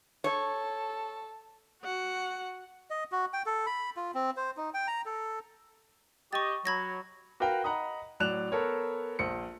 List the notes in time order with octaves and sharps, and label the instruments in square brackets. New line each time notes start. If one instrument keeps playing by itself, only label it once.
[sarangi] A4 [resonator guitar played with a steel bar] C#5
[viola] F#4 F#5
[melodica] D#5
F#4
G5
A4
B5
F4
C4
C5
D#4
G5
A#5
A4
[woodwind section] G4 D#5 [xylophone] C#6 A6
[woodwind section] F#3 [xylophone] B5 G#6 A#6
[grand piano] F#4 A#4 B4 F5 G5
D#5 F#5 A#5 B5 D#6
A2 F#3 D5 F#6 E7 F7
B3 A4 A#4 C#5
A#1 C5 C#7